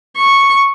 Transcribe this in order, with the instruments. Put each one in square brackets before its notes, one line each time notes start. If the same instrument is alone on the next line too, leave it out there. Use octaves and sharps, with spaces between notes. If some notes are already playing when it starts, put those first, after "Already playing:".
[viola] C#6